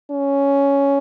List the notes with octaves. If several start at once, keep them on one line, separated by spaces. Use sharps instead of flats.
C#4